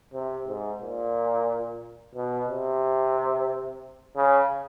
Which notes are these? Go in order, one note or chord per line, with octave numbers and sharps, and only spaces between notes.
C3
G#2
A#2
B2
C3
C#3